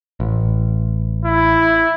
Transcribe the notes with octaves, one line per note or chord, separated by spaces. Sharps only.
A1
E4